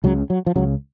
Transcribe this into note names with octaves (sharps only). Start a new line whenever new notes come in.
C#2 C#3 F#3
F#3
F3
C#2 C#3 F#3